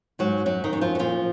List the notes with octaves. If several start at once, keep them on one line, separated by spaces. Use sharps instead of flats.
G#2 F#3 F#4
F#2 F#3 F#4
D#3 D#4
F#2
F3 F4
F#4
A#2 F3 F4